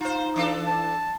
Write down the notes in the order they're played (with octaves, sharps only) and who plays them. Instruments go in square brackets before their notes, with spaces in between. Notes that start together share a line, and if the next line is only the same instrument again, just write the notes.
[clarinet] D#4 [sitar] F4 C5
[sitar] E3 D4 A4
[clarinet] A5